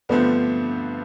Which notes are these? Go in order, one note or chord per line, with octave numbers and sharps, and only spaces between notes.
G2 D3 F3 A3 B3 C4